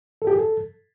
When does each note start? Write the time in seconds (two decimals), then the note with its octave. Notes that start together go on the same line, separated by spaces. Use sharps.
0.22 A4
0.27 G4
0.33 G#4
0.38 A4